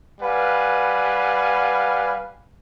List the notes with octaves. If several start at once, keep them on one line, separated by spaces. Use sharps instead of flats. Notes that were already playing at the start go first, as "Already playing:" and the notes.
G3 B4 F5 F#5 G#5